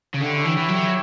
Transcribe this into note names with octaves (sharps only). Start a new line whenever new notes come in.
C#3
D3 E4 G4 C#5 E5 G5
E3
E3
F#3